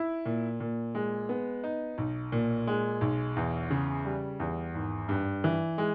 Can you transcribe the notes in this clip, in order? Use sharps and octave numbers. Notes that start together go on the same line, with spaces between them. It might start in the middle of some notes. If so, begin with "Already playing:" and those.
Already playing: E4
A#2
A#2
G#3
B3
D#4
B1
A#2
G#3
B1
E2
C#3
G3
E2
G#1
G2
E3
G#3